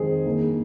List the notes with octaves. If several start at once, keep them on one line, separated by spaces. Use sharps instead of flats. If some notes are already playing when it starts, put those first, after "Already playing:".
Already playing: F2 D#3 G#3 C4 G#4
G2 D#3 A#3